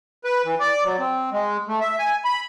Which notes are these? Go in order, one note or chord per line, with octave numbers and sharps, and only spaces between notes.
B4
E3
D5
F#3
C4
G#3
A3
E5
G#5
B5